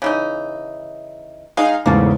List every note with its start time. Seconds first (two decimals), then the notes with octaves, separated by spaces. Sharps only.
0.02 C#3 E3 D#4
1.57 G#3 D#4 G#4 F5
1.86 E2 G#2 C#3 A3 A#3 A5